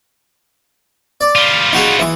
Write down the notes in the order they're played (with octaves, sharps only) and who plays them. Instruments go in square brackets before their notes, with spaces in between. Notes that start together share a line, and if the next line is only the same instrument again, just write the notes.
[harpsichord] D5
[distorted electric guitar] G3 F4
[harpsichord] D#4 F#4 G#4
E3 D#6